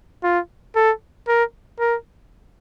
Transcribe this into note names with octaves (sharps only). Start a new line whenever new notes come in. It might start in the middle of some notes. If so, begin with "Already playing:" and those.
F4
A4
A#4
A#4